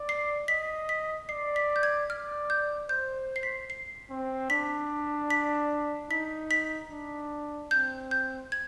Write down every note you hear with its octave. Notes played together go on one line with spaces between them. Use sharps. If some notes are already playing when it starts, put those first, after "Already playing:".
Already playing: D5
C7
D#5 B6
B6
D5 C7
B6
G6
G#6
D5 F6
G6
C5 G6
C7
B6
C7
C4
D4 B6
B6
D#4 B6
B6
D4
C4 G6
G6
G#6